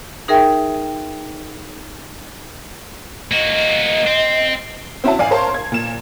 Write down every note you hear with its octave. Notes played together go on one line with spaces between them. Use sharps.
D#4 G#4 A#4 E5 G5
A#3 F#4 D#5
C4
C4 C#4 E4 F#4 E5 A5
G#1 D5 F5 G#5 C7
A#4 C5 C#5 F5 A5 C6
G#6
A#2 E7